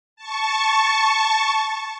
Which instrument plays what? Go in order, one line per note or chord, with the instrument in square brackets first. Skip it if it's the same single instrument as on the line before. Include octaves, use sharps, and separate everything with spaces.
[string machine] A5 C#6